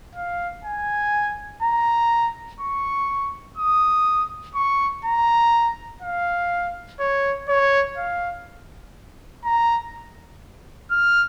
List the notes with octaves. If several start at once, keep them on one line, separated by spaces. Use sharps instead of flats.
F5
G#5
A#5
C#6
D#6
C#6
A#5
F5
C#5
C#5
F5
A#5
F6